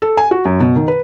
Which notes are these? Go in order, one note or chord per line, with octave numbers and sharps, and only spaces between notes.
A4
G#5
F#4
F#2
B2
D#3
B4